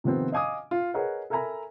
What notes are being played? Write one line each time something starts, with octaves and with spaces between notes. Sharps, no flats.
C3 D#3 F3 B3 C4
D#5 F5 G#5 D6 D#6
F4
G#4 A#4 B4 C#5 D#5 F#5
A4 A#4 E5 G#5 A#5 B5